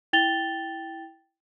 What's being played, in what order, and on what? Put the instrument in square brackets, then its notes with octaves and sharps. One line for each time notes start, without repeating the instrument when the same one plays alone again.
[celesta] E4 G5 A6 F7 G7